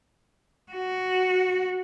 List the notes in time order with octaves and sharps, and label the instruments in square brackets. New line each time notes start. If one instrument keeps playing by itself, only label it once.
[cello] F#4